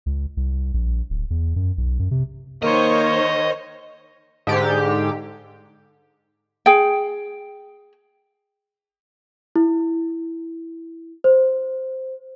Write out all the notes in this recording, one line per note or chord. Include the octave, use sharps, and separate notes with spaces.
C#2
C2
A#1
D1
E2
F#2
B1
F#2
C3
D#3 A#3 C5 C#5 D#5
G#2 D3 G4
G#4 G5
E4
C5